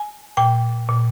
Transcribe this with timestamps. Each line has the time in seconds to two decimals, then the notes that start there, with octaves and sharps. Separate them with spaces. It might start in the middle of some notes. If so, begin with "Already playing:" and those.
Already playing: G#5
0.37 A#2 G5
0.89 A#2